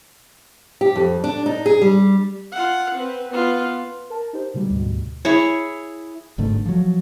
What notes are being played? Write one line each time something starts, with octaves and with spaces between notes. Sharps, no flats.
G4
F2
D4
D#4
G#4
G3
F4 F#5
C4 B4
B3 F4
A#4 A5
D#4 G4 C5
B2 D3 G3 G#3
D2 G#2 B2
E4 G#4 C#5
G#1 G#2 D3 A3
F3 F#3